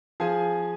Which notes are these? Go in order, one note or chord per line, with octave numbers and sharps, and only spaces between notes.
F3 G#4 G#5